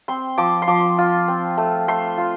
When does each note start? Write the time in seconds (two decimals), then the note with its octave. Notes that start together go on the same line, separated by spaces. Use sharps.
0.08 C4 C6
0.38 F3 D6
0.62 C6
0.67 F3 D6
0.98 F4
1.28 C4
1.57 A3
1.88 A3 C6
2.18 F4